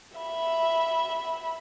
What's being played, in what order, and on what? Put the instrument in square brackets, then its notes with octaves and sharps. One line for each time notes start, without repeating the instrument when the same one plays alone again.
[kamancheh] E5 B5